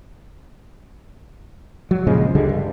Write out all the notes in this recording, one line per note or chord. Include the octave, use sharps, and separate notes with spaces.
F#3
A#2 C#3 F3 G#3
C#2 D3 G3 G#3
G2